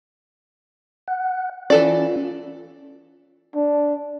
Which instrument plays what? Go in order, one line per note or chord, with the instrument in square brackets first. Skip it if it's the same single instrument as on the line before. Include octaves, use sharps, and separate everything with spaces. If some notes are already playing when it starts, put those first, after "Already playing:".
[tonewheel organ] F#5
[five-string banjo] E3 A4 D5 [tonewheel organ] C#4 F4
[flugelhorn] D4